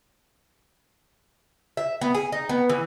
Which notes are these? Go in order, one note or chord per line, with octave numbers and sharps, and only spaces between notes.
E5
B3
G#4
D#4
B3
E3